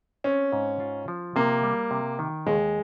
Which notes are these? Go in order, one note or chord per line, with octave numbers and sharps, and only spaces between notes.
C4 C#4
G#2
F4
F3
C3 A#3
G3
C3
D#3
D#2 G#3